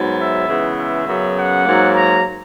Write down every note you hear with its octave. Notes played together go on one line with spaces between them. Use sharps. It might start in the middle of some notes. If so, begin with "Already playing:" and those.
Already playing: G#2 F#3 B3
E5
C#3 E3 G#3 B3
E5
F#2 C#3 F#3 B3
F#5
G#2 F#3 A#3
A#5